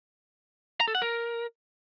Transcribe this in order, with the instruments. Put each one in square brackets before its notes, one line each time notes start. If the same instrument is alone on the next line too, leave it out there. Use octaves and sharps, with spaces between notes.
[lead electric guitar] A#5
A4
F#5
A#4